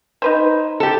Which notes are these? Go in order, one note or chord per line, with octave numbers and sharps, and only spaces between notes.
D#4 B4 C5
G4 A4